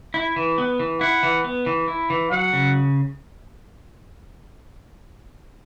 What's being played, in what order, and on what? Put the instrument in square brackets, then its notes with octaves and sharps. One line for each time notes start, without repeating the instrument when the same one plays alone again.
[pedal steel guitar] E4
E3
B3
E3
[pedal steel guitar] E4 [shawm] F#5
[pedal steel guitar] E3
B3
E3
E4
E3
[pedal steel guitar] F#3 [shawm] F#5
[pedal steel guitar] C#3